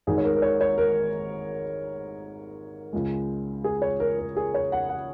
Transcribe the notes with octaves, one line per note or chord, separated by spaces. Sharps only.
G#1 G#2 D#3 G#3 G#4
C#5
A#4
A#4
C#5
C#5
A#4
C#2 C#3 G#3
G#4
C#5
A#4
A#4
G#4
C#5
F#5
F#5